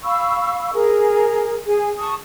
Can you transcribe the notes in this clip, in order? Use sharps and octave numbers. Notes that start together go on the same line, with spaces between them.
F5 B5 C#6 E6
G#4 A#4
G#4 G#5
A5 C#6 D#6